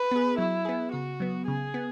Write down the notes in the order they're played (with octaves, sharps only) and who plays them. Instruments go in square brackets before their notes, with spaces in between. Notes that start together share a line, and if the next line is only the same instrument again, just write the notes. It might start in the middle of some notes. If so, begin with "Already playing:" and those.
Already playing: [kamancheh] B4
[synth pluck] B3 G#4
[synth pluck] F#3 [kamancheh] E4
[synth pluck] B3 G#4
[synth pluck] C#3 [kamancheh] F#4
[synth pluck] F#3 B3
[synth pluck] C#3 [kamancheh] G#4
[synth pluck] B3